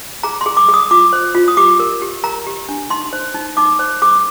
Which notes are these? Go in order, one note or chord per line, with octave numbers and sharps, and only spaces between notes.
G#4 A#5
C6
G#4
D6
G#4
D#6
F4 D6
C5
F4
D#6
G4 D6
A#4
G4
A#4 A#5
G4
D4
D#4 C6
C5
D#4
D#4 D6
C5
G#4 D6